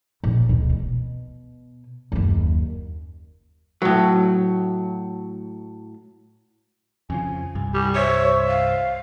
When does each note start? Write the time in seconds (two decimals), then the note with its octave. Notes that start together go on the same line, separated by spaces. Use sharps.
0.24 A#1
0.49 D2 B2
0.69 B2
2.12 F#1 D#2
3.82 A2 F#3
7.10 F2 C#3 F3 G#5
7.55 C2 G2
7.74 G3 G#5
7.96 C5 C#5 E5
8.48 F5